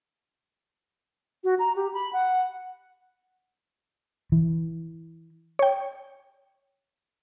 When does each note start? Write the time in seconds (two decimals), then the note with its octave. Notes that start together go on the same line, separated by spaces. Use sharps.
1.44 F#4
1.59 A#5
1.76 G4
1.94 B5
2.13 F#5
4.32 E3
5.59 C#5 G5